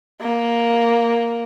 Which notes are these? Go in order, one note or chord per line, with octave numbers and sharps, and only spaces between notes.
A#3